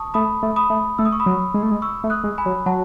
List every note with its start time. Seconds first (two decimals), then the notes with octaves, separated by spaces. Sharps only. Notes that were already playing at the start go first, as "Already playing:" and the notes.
Already playing: A5 C#6 D#6
0.14 A3 B5 D#6
0.43 A3
0.56 B5 D#6
0.70 A3
0.98 A3 E6
1.05 D#6
1.12 C#6
1.20 B5 D#6
1.26 F#3
1.54 G#3
1.63 A3
1.71 G#3
1.82 C#6 E6
2.04 A3
2.10 D#6 F#6
2.24 G#3
2.38 G#5 B5
2.46 F#3
2.66 F#3 F#5 A5